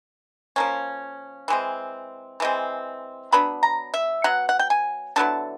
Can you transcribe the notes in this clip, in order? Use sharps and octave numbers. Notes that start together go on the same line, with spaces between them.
F3 A#3 C#4
E3 G#3 C4
E3 G#3 C4
F#3 B3 D4 B5
A#5
E5
F#3 B3 F#5
F#5
G5
G#5
D3 F#3 B3 E4 A5